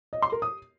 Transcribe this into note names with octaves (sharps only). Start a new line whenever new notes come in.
D#5
C6
A#4
D#6